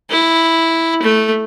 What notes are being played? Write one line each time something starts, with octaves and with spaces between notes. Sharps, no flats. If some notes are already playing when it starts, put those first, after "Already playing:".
E4
A3